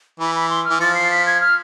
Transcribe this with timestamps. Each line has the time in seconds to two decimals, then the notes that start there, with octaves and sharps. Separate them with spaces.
0.20 E3 B5
0.35 B5
0.50 C6
0.65 E3 F6
0.80 F3 A6
0.95 C7
1.11 B6
1.27 G#6
1.41 F6